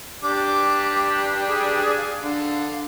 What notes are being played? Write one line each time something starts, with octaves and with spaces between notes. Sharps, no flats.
D4 G4 D6
G#4
F5
D3 F5